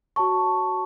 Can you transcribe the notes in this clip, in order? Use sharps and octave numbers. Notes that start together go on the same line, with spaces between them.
F#4 C#5 A5 C#6